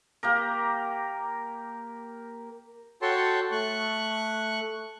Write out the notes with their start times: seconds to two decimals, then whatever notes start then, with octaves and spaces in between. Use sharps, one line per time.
0.23 A#3 G4 A#4
3.02 F#4 A4 C#5 G5 A5 C6
3.52 A3 C#6 F#6